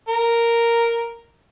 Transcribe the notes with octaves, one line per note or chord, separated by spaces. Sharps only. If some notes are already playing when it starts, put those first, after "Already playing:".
A#4